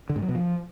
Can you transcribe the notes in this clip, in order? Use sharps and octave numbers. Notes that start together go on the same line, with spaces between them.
D3
G#2
F#3
B2
F3